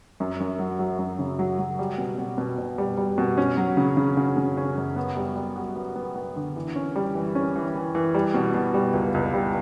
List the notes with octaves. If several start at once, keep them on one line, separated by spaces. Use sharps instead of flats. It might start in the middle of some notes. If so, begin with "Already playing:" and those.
F#2
F#2
F#3
F#3
F#2
C#3
F#3
F#3
G3
B2
B2
B2
B2
G3
G3
B2
C#4
F#3
C#3
C#3
C#3
C#3
C#4
F#2
B3
G3
G3
F#4
B3
B3
B3
D3
E3
C#4
G3
E3
C#4
E3
E3
E3
G3
B2
B2
G3
C#2
C#2
G3